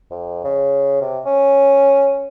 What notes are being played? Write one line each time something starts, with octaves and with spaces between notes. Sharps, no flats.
F2
C#3
C3
C#4